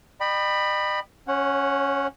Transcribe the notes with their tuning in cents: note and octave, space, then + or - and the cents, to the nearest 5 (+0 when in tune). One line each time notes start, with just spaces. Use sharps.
D#5 -45 G5 +0 B5 +0
C#4 +0 C#5 -40 F#5 +0